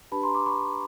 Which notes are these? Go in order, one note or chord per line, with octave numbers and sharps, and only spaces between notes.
D4 G4 B4 A5 B5
A#5 C6
C6 D6
B5 C#6